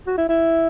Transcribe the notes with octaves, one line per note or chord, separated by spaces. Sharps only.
F#4
E4
E4